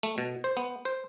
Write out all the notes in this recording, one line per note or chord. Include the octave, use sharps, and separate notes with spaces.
A3
B2
C5
B3
C5